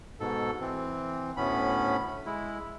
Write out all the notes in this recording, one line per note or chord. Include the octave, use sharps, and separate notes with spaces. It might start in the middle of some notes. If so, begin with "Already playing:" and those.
G#2 B2 A4
E3 C4
D2 A2 B3 C#4 B5
G#3 E4